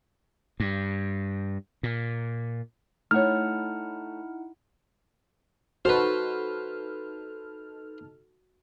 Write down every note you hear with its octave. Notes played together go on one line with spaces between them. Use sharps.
G2
A#2
A3 D#4 E4 C#5 F#5 F6
D#4 F#4 A4 B4 C5 F6